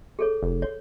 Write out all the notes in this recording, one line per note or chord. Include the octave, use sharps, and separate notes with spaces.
G#4 A4 C#5
F1
C#5